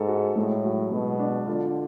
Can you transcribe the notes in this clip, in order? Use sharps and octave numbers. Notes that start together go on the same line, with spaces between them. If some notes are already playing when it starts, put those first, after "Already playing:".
Already playing: G#2 A4
F#4
A2 G#3
F#3
B2 G#3
D4
D3 F4